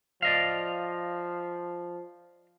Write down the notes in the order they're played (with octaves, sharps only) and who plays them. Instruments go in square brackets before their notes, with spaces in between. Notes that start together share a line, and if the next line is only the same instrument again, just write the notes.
[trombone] F3 [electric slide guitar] D5 D#5 F5